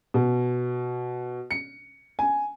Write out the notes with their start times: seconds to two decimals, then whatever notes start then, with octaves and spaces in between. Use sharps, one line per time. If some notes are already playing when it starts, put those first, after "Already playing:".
0.14 B2
1.51 C#7
2.19 G#5